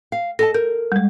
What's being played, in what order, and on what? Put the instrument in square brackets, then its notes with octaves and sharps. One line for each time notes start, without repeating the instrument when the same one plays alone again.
[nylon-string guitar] F5
[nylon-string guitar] A4 D#5 A5 [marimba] A#6
[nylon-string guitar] A#4 [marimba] G6
[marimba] G3 G#3